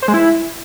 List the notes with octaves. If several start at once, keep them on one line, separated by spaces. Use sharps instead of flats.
C5
G#3
E4